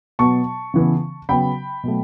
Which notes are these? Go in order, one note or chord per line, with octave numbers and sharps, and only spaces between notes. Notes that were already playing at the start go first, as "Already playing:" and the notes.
B2 F#3 B3 A5 C#6
C#3 E3 B3
C#3 F#3 B3 G5 B5
B2 F#3 A3